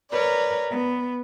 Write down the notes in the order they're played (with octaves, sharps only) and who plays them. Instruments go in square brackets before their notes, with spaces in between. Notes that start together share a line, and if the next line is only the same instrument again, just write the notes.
[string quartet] A#4 B4 C#5 D5
B3